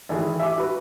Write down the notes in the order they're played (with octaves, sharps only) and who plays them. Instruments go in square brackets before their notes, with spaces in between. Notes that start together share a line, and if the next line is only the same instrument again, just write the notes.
[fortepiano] G#1 E3 G#4
E5 G#5 D6
F#4 B4